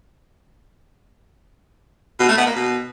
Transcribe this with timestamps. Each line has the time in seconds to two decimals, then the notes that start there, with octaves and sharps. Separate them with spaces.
2.19 B2
2.28 A3
2.38 B3
2.47 A#3
2.56 B2